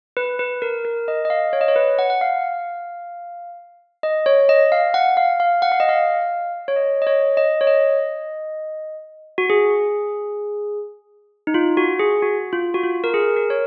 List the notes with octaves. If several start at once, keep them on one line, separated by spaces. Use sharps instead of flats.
B4
B4
A#4
A#4
D#5
D#5
F5
C#5
D#5
C#5
B4
F#5
F#5
F5
D#5
C#5
D#5
F5
F#5
F5
F5
F#5
F5
D#5
F5
C#5
D#5
D#5
C#5
D#5
C#5
D#5
F#4
G#4
D#4
F4
F#4
G#4
F#4
F4
F#4
F4
A#4
G#4
A#4
C#5